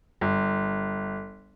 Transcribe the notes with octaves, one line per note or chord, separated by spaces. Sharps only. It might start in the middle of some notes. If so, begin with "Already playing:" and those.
G1